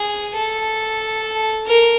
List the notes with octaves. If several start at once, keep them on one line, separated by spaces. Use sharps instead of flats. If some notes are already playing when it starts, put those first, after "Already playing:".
Already playing: G#4
A4
A#4